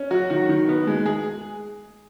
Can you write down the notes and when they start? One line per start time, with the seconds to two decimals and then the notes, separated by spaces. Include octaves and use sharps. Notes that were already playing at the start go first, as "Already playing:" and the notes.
Already playing: C#4
0.11 F#3 F#4
0.30 D#3 F#4
0.49 D#3
0.69 B3
0.87 G#3
1.06 G#4